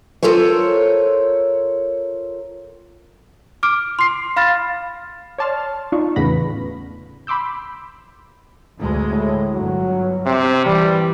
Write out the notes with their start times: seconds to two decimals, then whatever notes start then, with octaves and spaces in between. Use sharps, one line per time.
0.23 F4 A4 A#4 C5 C#5
3.63 D6 F6 D7
3.99 C6 C7
4.36 F5 B5 F6 A6
5.38 C#5 D5 A5 C6 F6
5.92 D4 D#4 F4 C#6
6.16 E2 A2 C#3 B3 B5 A#6
7.27 B5 C6 D6 E6 G6
8.80 D2 G#3
9.11 A2
9.54 G1 F#3
10.26 C3
10.66 E3 G3